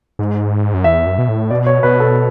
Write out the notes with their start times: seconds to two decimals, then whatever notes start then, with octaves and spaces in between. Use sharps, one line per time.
0.19 G#2
0.74 F#2
0.84 E2 E5
1.07 F#2
1.18 B2
1.29 A2
1.51 B2 D5
1.67 C#5
1.83 B2 B4
2.00 A4